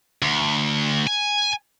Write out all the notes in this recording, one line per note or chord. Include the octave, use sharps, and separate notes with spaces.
D2
G#5